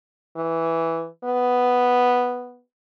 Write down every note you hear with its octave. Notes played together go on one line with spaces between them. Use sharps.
E3
B3